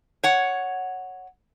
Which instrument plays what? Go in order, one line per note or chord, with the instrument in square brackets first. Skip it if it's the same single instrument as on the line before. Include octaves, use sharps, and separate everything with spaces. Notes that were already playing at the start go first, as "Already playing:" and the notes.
[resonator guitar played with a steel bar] C#5 F#5